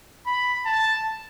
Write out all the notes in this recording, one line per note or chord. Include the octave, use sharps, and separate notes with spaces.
B5
A5